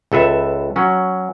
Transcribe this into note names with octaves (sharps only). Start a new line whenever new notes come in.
C#2 A4 B4 E5
F#3 C#4